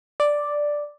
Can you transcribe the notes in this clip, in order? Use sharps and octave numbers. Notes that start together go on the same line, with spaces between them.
D5